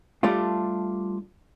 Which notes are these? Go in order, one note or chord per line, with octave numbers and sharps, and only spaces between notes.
G3 A3 D4 F4